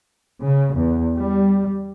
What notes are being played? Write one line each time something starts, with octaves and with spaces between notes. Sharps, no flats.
C#3
E2
G3